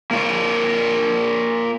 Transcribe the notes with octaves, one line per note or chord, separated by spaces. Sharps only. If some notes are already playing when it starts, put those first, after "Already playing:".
A#3 F4 C#5